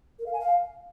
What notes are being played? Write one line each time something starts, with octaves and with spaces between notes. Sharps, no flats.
A#4
F5
G#5
F5